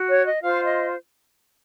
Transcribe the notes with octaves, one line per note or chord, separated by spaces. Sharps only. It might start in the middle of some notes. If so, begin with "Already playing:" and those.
Already playing: F#4
C#5
D#5
F4 C5 F5
D#5